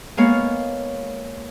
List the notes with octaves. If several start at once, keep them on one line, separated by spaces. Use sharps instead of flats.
G#3 A#3 B3 C#5 F5